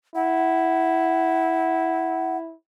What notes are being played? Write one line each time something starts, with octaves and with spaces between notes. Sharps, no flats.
E4 F#5